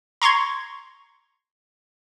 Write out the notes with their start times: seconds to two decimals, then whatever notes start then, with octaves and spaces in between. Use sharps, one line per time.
0.22 A#5 C6 C#6 G#6